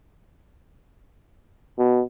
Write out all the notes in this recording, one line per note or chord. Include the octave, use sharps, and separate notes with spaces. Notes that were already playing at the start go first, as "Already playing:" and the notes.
B2